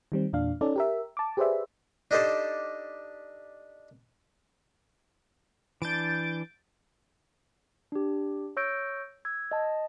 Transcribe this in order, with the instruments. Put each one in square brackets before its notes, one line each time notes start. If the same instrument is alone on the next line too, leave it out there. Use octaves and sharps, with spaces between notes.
[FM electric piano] D#3 G3 C4
E2 A#2 D4 F5
C#4 D#4 A4 D5
G4 A#4 E5
A5 D6
G4 G#4 B4 C5 D5 E5
[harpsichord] D4 D#4 G4 A4 C5
[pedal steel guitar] E3 D4 [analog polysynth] G6 A6 D7
[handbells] D4 G4
C#5 C#6 E6 G6 A#6 D7
E6 G#6
D#5 A5